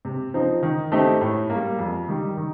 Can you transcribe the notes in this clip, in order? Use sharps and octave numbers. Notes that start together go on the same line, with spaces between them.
C3
F3 C4 D#4
D#3
A3 C4 D#4 G4
A2
G3 A#3
F2
D#3 G3
D#3